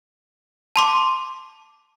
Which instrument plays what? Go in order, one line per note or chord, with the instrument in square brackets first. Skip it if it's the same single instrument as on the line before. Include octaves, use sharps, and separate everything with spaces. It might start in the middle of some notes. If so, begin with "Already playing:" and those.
[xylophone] A5 C6 D6